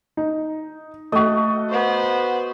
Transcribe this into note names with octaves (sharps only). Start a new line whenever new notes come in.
D#4
A3 F#4 D#5
B3 C5